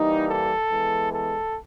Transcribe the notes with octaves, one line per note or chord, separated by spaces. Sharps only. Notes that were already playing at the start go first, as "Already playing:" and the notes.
Already playing: E3 G3 A#3 D#4
A4
E3 G#3 B3
A4